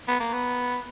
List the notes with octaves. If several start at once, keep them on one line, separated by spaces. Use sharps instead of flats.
B3
A#3
B3